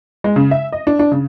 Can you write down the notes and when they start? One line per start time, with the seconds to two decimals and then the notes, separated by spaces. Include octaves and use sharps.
0.24 G#3
0.36 C#3
0.51 E5
0.72 D#5
0.87 D4
0.99 D4
1.11 C#3